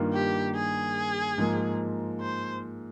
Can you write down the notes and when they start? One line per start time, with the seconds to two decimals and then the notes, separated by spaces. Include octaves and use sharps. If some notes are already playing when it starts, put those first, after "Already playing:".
Already playing: G2 D#3 A#3 F4
0.13 G4
0.54 G#4
1.38 G#2 F3 A#3
2.20 C5